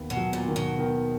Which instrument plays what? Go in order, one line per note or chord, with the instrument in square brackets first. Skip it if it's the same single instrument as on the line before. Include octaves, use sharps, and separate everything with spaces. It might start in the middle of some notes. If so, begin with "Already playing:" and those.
Already playing: [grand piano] D#2 D#3 B3
[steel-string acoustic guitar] B2
[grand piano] F#3
[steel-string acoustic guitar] A#2
[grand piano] D#3
[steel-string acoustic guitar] B2
[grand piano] D#3